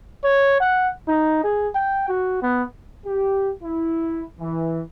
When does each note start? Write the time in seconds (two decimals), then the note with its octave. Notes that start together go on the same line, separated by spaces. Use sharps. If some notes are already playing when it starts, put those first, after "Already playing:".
0.24 C#5
0.61 F#5
1.08 D#4
1.44 G#4
1.75 G5
2.08 F#4
2.42 B3
3.06 G4
3.64 E4
4.40 E3